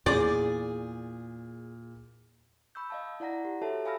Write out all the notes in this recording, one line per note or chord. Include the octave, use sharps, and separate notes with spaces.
E2 A#2 G#4 D5 G6
B5 C#6 E6 G6
D#5 F5 A5
E4 D5 F#5 A#5 A#6
G4
F#4 G4 A4 C#5 E5 A5
F5 G#5 B5 E6 F6 A#6